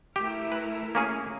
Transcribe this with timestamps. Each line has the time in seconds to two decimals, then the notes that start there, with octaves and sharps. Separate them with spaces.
0.16 A3 E4 G4 A#4
0.52 B4
0.95 A#3 C#4 G#4